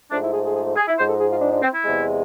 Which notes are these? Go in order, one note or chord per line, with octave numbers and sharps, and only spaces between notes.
G#2 F3 A3 D4
E4
G#4
G#4
G#4
G#4
E4
G#2 F3 G#3 C5
A4
G#4
F4
D4
D4
C4
E4
E2 C3 G#3